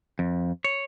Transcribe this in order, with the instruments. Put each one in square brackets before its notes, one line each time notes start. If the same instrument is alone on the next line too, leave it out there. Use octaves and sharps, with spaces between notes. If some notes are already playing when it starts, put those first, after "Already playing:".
[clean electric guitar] F2
C#5